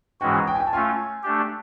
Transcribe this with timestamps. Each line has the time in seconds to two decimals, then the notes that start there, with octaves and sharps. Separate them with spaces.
0.21 G#2 E3 G#3 C#4 F#4 G5
0.34 G#5
0.48 G5
0.55 G#5
0.60 G5
0.67 A5
0.73 A3 C#4 F4 G#5
1.23 A3 D4 G4